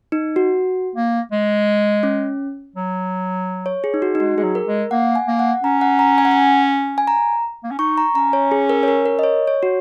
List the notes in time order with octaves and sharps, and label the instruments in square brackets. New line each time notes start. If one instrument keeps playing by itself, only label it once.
[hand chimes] D#4
F#4
[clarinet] A#3
G#3
[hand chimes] C#4
[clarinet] F#3
[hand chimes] C#5
G#4
D#4
F#4
D#4
[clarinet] G#3 [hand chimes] F#4
[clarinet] G#3 [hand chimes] G#4
[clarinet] F#3
[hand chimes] A#4
[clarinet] G#3
[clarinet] A#3 [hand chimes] F#5
[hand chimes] G#5
[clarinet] A#3
[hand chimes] F#5
[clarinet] C#4 [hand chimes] A#5
[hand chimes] F#5
A#5
G#5
F#5
G#5
G#5
A#5
[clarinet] A#3
C#4
[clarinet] D#4 [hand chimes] C#6
[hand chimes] A#5
[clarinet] C#4 [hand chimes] A#5
[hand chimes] C#5
G#4
A#4
C#5
A#4
A#4
D#5
C#5
C#5
F#4